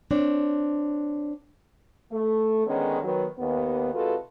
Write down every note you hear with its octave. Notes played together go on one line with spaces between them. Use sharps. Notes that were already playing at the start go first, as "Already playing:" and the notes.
C4 D4 C#5
A3
D3 D#3 G#3 B3 C#4
D#3 F#3 B3
D#2 B3
C3 G#3 F4 F#4 A4 B4